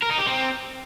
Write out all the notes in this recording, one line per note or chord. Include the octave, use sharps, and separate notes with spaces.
A#4
D#4
G4
C4